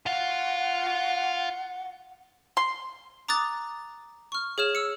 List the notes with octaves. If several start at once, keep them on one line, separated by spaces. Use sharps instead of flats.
F4 F5 F#5
C6
A#5 D6 D#6 F#6 A6
C#6 F6
G#4 C#5 F6 E7
E6 C#7